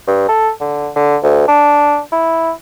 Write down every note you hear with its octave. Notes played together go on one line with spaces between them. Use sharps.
G2
A4
D3
D3
D2
D4
E4